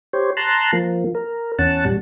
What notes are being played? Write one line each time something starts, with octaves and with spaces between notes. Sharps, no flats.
G4 C5 C#5
A5 A#5 C6 F#6
F3 A#3
A#4
E2 C#4 F#5 A5
A#2 G3